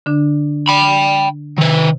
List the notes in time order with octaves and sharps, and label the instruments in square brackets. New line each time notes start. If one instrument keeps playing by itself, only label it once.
[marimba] D3 D4
[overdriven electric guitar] G5 B5
[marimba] C3 [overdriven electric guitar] D#3 B4